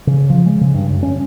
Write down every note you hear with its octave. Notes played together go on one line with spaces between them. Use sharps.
C#3
F3
G#3
C#3
G2
F#2
C#4